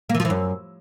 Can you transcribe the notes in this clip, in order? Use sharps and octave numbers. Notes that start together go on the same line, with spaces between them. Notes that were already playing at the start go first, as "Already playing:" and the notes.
A#3
E3
F3
E3
F#2